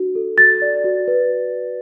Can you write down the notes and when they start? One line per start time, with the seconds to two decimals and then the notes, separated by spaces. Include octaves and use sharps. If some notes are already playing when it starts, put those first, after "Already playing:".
Already playing: D4 F#4
0.15 A4
0.38 F#4 A6
0.62 D5
0.84 F#4
1.08 B4